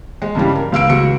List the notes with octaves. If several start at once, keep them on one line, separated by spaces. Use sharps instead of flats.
G#3
G2 C#3 E3 G3
A#4
C#2 F5 E6 D7
C#2 F#4 C#7